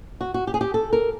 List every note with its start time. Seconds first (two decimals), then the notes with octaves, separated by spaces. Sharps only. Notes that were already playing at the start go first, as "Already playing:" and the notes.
0.21 F#4
0.34 F#4
0.47 G4
0.54 G#4
0.61 G4
0.74 A4
0.93 A#4